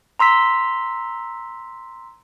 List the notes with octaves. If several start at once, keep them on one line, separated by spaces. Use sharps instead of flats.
A#5 C6 E6 B6